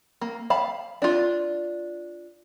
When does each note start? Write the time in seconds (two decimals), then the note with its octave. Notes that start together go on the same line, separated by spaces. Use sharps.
0.21 A#3
0.50 F5 A5 B5
1.02 D4 F4